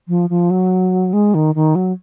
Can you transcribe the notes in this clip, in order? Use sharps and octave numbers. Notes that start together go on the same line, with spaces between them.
F3
F3
F#3
G#3
D#3
D#3
F#3